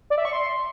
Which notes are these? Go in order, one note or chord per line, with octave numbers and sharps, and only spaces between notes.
D5
E5
C#6
C6